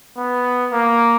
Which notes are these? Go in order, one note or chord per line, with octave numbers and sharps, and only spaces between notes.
B3
A#3